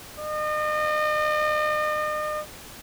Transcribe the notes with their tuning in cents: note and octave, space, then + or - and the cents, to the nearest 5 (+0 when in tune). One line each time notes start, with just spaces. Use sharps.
D#5 -40